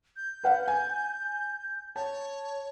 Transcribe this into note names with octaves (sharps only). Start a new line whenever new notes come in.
G6
B4 F5 F#5
G#5
C#5 A5